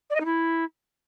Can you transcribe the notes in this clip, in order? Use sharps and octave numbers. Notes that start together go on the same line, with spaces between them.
D5
D#5
D#4
E4